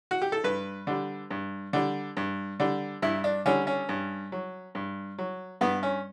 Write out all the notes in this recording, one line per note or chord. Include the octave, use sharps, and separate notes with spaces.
F#4
G4
A4
G2 B4
D3 G3
G2
D3 G3
G2
D3 G3
G2 E4
D4
D3 G3 C#4
C#4
G2
F#3
G2
F#3
G2 B3
C#4